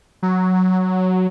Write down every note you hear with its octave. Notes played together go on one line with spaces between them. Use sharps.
F#3